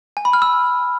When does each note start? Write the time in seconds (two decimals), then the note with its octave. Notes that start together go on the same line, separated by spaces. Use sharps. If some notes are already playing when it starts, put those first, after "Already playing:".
0.17 G#5
0.25 B5
0.33 F6
0.42 E6